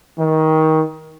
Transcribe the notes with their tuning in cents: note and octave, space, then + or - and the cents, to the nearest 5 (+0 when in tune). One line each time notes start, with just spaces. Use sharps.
D#3 +20